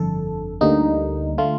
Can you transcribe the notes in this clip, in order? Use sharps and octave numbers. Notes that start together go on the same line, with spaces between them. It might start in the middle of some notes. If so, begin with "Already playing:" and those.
Already playing: G1 F2 D3 A4
D2 D3 G3 A#3 D#4
D3 A3 F4